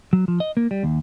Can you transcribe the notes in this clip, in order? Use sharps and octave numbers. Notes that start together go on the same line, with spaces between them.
F#3
F3
D#5
A#3
G3
D#2